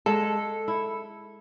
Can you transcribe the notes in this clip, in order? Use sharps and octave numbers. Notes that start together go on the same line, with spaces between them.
G#3 A4 A5
E4